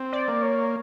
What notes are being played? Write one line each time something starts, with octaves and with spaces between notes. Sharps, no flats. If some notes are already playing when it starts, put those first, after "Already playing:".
Already playing: C4
D5
A#3
C#5